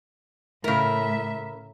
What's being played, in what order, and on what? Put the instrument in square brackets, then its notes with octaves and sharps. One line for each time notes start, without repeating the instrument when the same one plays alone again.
[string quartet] A2 E5 [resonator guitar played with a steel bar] C#3 A#4